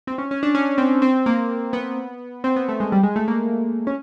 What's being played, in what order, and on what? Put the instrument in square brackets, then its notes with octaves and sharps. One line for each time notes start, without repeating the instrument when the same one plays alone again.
[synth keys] C4
C#4
C#4
D4
C#4
C4
C4
A#3
B3
C4
B3
A3
G#3
G3
G#3
A3
A#3
C#4